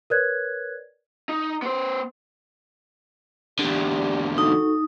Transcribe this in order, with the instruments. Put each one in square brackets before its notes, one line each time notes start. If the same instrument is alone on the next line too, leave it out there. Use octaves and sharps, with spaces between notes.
[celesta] A#4 B4 C#5 D5 F#6 G#6
[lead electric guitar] D#4
B3 C5
[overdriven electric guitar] E2 D3 [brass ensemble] G4 D5
[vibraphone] D#4 [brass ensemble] F#4 A4 [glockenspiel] D#6